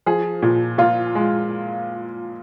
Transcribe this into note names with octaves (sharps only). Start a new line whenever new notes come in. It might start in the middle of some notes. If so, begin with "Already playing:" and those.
F3 G#4
A#2
A#2 F4
G#3